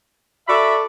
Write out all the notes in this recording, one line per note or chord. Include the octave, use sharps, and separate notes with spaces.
F#4 A4 D5 E5 B5